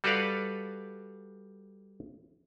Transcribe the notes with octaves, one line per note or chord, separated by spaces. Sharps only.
G3 F#4 A4 B4 D5 F5